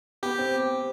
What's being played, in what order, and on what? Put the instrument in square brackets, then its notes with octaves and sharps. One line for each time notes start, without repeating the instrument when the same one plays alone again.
[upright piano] B3 [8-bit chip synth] G4
[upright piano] C4